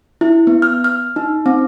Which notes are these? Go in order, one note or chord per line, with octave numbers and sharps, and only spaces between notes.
E4
B3
F6
F6
D#4
C4